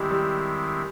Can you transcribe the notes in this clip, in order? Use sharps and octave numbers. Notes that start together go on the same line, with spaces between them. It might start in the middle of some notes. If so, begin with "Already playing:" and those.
Already playing: D#3 G3 G#3 C4 E4 G4
G3